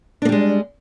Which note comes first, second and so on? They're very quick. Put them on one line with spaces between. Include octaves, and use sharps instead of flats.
D4 A#3 G3 G#3